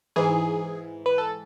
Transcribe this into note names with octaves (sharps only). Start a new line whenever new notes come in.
G#2 E3 G#4
B4
A4